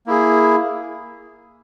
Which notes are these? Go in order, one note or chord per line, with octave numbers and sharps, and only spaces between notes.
A#3 E4 G#4